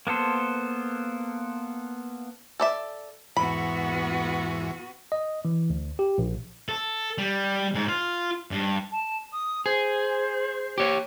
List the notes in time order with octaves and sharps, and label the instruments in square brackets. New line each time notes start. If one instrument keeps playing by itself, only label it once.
[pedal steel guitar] A#3 B3 A4 C5
[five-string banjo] A4 D5 E5
[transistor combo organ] E2 G#2 E3 [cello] B3 F#4 [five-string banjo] B5
[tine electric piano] D#5
E3
D2
G4
A#1
[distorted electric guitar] A4
G3
G#2
F4
G2
[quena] A5
D#6
[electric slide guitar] G#4 [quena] C5
[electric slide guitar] G4 C#5